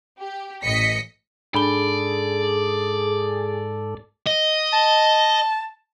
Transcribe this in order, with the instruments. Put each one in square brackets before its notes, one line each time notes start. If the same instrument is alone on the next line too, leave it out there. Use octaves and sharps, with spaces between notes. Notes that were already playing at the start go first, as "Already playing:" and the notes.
[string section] G4
A1 D#5 B6 C#7
[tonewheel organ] G#2 A4 [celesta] D4 B5 G7 [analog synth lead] G#4 [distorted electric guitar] D5
[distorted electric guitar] D#5
[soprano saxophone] A5